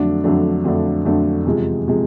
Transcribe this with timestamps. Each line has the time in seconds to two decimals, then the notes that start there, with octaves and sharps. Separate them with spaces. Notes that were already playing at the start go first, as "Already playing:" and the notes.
Already playing: F2 D3 F#3 A3 D4
0.24 F2 D3 F#3 A3 D4
0.64 F2 D3 F#3 A3 D4
1.05 F2 D3 F#3 A3 D4
1.45 E2 C3 F3 G#3
1.88 C3 F3 G#3